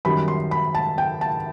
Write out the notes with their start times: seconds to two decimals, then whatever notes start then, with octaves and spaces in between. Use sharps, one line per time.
0.05 F#2 D#3 G3 B5
0.28 C6
0.51 B5
0.75 A5
0.98 G5
1.21 A5